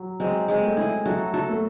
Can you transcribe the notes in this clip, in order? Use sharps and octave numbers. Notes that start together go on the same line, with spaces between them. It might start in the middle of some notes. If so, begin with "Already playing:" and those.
Already playing: F#3
F#3 G#3 C4
G#3 C4
A3
E4 G#4
F#3 F#4 A4
F#4 A4
A3